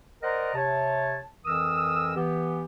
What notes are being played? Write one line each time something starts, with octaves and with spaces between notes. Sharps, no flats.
A#4 C5 D5 D#5 F#5 A#5
C3 C#5 A5
F2 E3 A#4 D#6 E6
E3 B3 G4